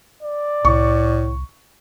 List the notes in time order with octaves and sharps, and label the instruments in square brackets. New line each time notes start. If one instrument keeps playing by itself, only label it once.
[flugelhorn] D5
[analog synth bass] C2 [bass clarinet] A2 [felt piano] C#6